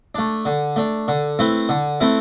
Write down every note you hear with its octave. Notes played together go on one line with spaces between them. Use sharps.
A3 D4
D3
A3 D4
D3
A3 C4 E4 B4
D3
A3 C4 E4 B4